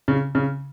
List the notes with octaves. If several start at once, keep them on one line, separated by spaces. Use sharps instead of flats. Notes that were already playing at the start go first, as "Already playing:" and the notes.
C#3
C#3